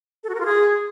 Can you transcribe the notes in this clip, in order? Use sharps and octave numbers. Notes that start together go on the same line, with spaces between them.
A4
F#4
A#4
F4
G#4